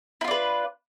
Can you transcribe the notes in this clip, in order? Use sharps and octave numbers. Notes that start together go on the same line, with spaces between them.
D4 E4 F4 B4